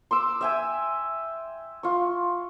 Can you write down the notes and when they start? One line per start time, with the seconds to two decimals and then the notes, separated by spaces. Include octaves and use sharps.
0.11 C6 D6 E6
0.41 E5 G5 G#5
1.83 F4 C#6